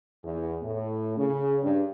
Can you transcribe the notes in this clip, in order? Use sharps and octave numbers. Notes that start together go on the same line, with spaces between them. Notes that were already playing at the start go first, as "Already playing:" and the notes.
E2
A2
C#3
G2